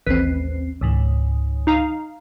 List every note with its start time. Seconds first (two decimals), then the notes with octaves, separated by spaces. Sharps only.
0.06 A1 D#2 C4 B4
0.81 C#2 G#2 D#3
1.67 D#4 F5 A#5